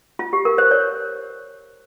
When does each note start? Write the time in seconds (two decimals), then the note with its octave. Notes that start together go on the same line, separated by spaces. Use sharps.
0.19 F4
0.33 G4
0.45 A#4
0.58 C5
0.71 C#5